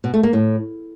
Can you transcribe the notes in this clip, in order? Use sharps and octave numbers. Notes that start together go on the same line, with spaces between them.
B2
A3
A#3
A2